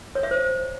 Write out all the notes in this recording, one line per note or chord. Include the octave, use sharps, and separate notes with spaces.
C#5
E5
C5